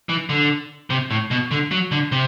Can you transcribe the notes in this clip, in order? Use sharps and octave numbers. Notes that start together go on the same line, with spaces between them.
E3
D3
C3
A2
B2
D3
F#3
D3
C3